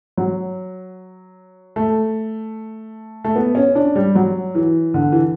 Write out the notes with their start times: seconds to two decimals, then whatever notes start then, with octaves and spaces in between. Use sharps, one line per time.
0.18 F#3
1.76 A3
3.25 A3
3.36 B3
3.55 C#4
3.75 D4
3.96 G3
4.15 F#3
4.55 E3
4.94 D3
5.12 E3